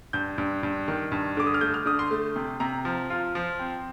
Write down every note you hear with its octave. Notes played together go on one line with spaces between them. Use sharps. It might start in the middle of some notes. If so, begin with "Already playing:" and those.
G2 G6
G2
G2
D#3
G2
D3 D6
D#6
F6
A3 G6
F6
D3 D#6
C6
A3
C3
C3 A#5
F3
F4
F3
C4